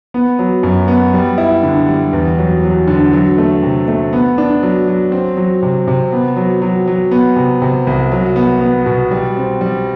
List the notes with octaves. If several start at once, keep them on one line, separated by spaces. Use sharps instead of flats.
B3
F#3
F#2
B3
G3
E4
D3
G3
E2
F#3
F#3
D3
F#3
A3
C3
A3
B3
D4
F#3
F#3
C4
F#3
C3
C3
B3
F#3
F#3
F#3
B3
C3
C3
C2
F#3
B3
B3
B2
G3
C4
G3